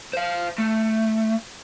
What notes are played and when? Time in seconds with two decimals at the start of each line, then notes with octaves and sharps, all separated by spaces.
0.13 C5 F5
0.58 A3